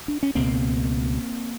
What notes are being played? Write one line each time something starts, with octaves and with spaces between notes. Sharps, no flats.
D4
C#4
C#2 B2 A#3 C4